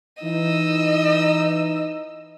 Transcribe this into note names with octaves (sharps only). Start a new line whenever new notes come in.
E3 D#4 D#5 E6